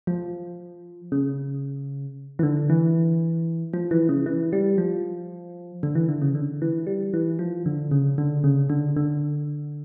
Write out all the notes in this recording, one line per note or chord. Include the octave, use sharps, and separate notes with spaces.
F3
C#3
E3
D3
E3
F3
E3
C#3
E3
G3
F3
D3
E3
D3
C#3
D3
E3
G3
E3
F3
D3
C#3
D3
C#3
D3
D3